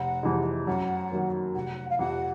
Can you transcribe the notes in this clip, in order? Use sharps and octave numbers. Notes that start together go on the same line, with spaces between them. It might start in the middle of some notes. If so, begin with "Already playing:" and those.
Already playing: F1 F#5
F2 C3 E3 G#3
F#2 F#5
D#3 F#3 A#3
F1 F#5
F5
F2 C3 F3 F#5